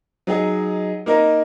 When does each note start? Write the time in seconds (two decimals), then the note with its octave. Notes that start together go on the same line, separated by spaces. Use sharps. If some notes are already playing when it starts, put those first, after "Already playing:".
0.27 F#3 D#4 G#4 D#5
1.06 A#3 D#4 A#4 D#5